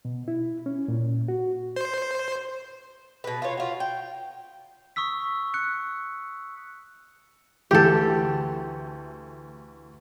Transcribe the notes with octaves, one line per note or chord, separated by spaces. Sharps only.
B2
E4
C#4
A#2
F#4
C5
B2 B4
F4 C#5
F4 F#4
G5
C#6 D#6 E6 B6
F#6 C#7
D2 E3 G4 A4